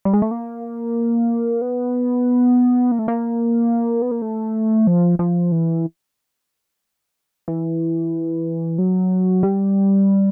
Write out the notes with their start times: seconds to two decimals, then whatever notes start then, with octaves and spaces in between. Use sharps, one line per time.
0.05 G3
0.14 G#3
0.22 A3
0.31 A#3
1.62 B3
2.91 A#3
2.99 A3
3.08 A#3
4.02 B3
4.11 A#3
4.22 A3
4.87 F3
5.19 F3
5.52 E3
7.48 E3
8.78 F#3
9.43 G3